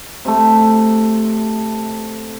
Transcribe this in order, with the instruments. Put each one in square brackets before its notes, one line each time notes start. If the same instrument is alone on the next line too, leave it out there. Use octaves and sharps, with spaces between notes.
[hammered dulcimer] C3 A3